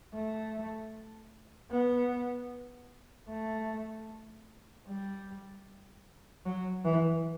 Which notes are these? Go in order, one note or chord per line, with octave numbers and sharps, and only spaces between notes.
A3
B3
A3
G3
F#3
E3